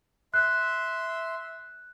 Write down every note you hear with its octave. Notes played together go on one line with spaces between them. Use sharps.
E5 C6 F#6